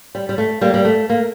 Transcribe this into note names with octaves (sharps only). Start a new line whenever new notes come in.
G3
G3
A3
G3 A#3
G3
A3
A#3